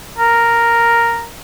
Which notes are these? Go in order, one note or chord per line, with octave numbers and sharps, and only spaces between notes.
A#4